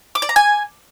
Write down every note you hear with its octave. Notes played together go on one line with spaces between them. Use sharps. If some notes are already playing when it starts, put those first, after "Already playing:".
D6
D5
A#5
G#5